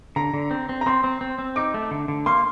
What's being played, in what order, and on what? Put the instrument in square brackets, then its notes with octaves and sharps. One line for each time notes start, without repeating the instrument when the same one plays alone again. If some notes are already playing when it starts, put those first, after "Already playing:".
[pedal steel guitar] D3 [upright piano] A#5
[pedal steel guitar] D3
C4
C4
[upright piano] A#5
[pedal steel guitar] C4 [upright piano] C6
[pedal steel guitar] C4
C4
C4
[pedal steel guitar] D#4 [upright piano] D6
[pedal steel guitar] A3
D3
D3
[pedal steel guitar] A#3 [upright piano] C6